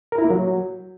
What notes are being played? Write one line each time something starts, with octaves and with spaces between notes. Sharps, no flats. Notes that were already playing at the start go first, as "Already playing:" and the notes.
A#4
E4
A#3
F#3